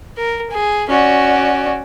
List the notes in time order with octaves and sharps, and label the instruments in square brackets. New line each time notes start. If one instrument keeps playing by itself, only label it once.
[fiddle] A#4
G#4
[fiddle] C#4 [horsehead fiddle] F#4 D5